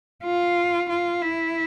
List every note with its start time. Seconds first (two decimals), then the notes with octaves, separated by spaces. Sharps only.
0.24 F4
0.90 F4
1.22 E4